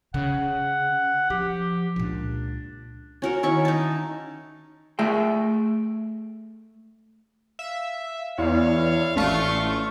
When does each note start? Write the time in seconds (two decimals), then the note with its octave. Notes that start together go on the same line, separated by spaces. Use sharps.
0.14 C#3 F#5
1.30 F3 G4
1.96 C#2 A#2 D4
3.22 C#4 F#4 A#4
3.43 D#3 C#4 E4 C#6
3.65 D#4 A5
4.99 A3 G#4 E5 G5
7.59 E5 F5
8.38 E2 E4 C#5 D5 F5
9.16 A1 A3 C#4 D4 F4 C#6